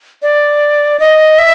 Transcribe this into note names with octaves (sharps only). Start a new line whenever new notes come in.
D5
D#5
E5